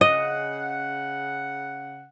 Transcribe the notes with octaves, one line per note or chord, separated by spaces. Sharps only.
C#3 D#5 F#5